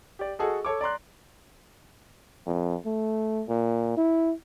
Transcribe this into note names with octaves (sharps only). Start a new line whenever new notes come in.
G4 D5
F#4 G#4 A4 D#5
A4 C#5 D6
D5 A#5 C6 F#6
F2
A3
A#2
E4